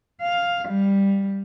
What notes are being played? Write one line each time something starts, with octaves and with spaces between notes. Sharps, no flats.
F5
G3